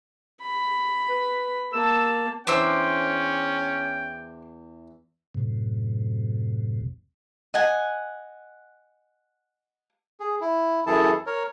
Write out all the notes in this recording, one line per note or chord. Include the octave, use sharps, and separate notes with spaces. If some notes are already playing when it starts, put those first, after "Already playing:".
B5
B4
A#3 A5 E6
E2 C#4 D4 C5 G5 E6
F#2 A2 C3
D#5 F#5 G#5
G#4
E4
F#2 E3 E4 G#4 A4 A5
A#4 C#5